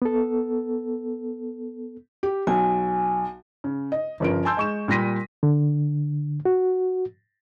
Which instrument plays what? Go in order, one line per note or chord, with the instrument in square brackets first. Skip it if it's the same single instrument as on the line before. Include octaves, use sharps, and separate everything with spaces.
[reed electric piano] B3 A4
[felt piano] G4
[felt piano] B1 [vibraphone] G#5
[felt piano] C#3
D#5
G1 C#3 F3 A#4 D7
G#5 A5 C6 E6 G6
G#3 C#6 E7
A#2 G3 C6 A#6 B6 D#7
[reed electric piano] D3
F#4